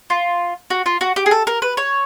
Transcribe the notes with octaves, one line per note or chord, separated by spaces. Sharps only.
F4
F#4
F4
F#4
G4
G#4
A4
A#4
B4
C#5